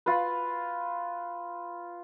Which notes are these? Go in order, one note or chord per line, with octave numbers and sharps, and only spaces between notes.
F4 B4